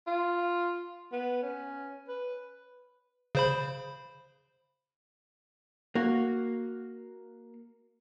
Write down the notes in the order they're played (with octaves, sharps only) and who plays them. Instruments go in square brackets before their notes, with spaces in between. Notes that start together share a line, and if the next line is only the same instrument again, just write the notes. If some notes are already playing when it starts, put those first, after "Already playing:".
[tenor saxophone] F4
B3
C#4
B4
[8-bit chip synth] C#3 C5 B5
[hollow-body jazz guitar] A#3 F#4